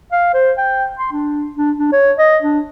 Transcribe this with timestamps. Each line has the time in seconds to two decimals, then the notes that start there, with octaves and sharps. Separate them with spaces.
0.12 F5
0.34 C5
0.58 G5
0.98 C6
1.12 D4
1.56 D4
1.78 D4
1.92 C#5
2.18 D#5
2.42 D4